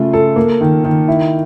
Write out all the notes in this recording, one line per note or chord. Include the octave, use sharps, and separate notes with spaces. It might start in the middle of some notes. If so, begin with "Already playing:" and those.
Already playing: C#3 A3 F4
A4
A#3
D#3
D#3
E4